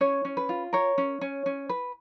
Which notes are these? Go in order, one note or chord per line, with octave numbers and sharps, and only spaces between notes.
C#4 C#5
C#4
B4
F4
A#4 C#5
C#4
C#4
C#4
B4